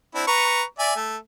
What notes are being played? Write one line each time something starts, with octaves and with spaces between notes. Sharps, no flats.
C4 D4 E4
B4 A#5 C#6
D5 E5 G#5
A3